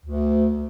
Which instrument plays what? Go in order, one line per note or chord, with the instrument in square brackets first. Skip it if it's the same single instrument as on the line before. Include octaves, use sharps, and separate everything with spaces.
[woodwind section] D2